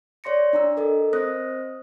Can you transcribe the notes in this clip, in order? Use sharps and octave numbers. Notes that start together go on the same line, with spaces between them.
C#5 D5 C6 A#6 C#7
D4 A#5 E6
A4 A#4 D#5
C4 C5 D#5 D#6 F#6 A#6